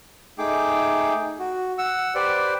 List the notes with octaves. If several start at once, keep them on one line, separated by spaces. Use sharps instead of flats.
A3 D#4 G#4 G5 D6
F#4
F#5 E6
G4 B4 C5 D5